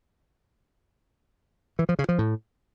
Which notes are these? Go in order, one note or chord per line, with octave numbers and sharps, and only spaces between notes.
E3
F3
C#3
F3
A2